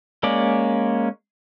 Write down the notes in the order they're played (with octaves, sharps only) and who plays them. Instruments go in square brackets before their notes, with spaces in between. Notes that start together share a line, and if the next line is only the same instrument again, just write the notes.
[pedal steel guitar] G#3 A#3 C#4 D5